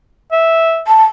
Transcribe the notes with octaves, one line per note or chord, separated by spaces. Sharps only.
E5
A5